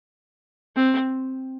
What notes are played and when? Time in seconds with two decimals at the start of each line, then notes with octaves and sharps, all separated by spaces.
0.76 C4